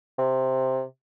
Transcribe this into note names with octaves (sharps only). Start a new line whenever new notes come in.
C3